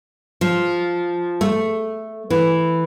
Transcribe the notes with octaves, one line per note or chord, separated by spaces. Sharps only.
F3
A3
E3